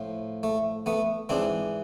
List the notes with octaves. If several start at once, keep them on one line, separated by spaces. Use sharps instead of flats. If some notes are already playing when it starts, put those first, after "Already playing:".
Already playing: A2 F3
A3
A3 B3
G#2 E3 C4 D4